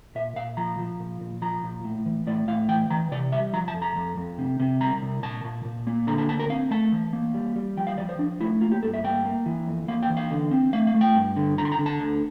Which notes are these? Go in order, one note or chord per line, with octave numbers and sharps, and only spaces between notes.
A#2 E5
A#2 F5
F3 A#5
F3
A#2
A#2
F3 A#5
A#2
A2
E3
A2 D5
A2 F5
E3 G5
E3 A#5
C3 D5
G3 E5
F3 A#5
A5
F2
A#5
F2
F2
C3
C3
C2 A#5
C2
A#2 A5
A#2
A#2
A#3
D3 A#5
A5
D2 A5
A#4
C4 F5
A3 A5
E3
A#3
G3
G3
F3 G5
F5
F3 D5
C5
F3 D4
A3 E4
A#3 F4
G4
G2 A4
E5
A#3 G5
A#3
E3
F2
A#3 F5
G5
E3
F5
D3
C4
A3 F5
F5
A3
G5
G2
D3
D3 A#5
C6
A#5
D3
A5
D2